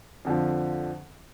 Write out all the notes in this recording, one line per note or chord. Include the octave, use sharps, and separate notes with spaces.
F2 D3 F3